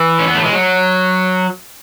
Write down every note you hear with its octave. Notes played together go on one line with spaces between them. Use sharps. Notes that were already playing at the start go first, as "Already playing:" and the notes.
Already playing: E3
C#4
B3
A3
G#3
F#3